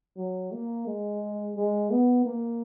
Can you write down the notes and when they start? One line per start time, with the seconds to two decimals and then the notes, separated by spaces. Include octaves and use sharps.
0.17 F#3
0.52 A#3
0.87 G#3
1.56 G#3
1.91 B3
2.26 A#3